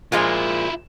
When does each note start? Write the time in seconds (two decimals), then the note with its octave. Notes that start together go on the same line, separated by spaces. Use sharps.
0.12 A#2 F3 G#3 E4 F4